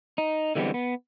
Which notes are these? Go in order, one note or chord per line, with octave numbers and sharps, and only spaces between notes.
D#4
D3 E3 G3 G#3 B3 C4
B3